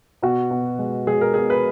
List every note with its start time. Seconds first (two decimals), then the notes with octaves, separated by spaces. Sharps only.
0.23 B2 F#4
0.51 B2
0.79 G#3
1.07 G#3 G#4
1.21 A#4
1.34 B2 G#4
1.50 B4